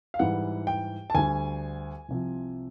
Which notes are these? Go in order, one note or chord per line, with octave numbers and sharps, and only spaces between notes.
F5
G#2 E3 G3 F#5
G5
A5
D2 D3 G3 G#5
C2 C3 F3